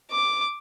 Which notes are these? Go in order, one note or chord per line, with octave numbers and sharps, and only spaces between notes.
D6